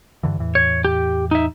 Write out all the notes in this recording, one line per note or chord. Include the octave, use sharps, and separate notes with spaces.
G2 D3 E3
E2 A2 E3
C#5
G4
D#4 E5